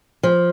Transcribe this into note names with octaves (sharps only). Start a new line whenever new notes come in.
F3